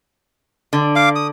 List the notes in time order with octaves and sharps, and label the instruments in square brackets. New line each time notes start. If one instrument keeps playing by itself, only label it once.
[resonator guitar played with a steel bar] D3
[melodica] F5 D6
D#6